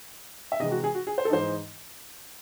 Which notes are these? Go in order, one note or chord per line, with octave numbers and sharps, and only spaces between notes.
E5
C3 E3 G#3 D#5
F#4
G#4
F#4
G#4
C5
A4
G#2 E3 G#3 D#4 C5